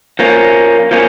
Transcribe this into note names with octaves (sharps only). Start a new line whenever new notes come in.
F3 A#3 C#4
F3 A#3 C#4